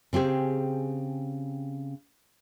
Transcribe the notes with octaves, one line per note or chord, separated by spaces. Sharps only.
C#3 C4 G4 G#4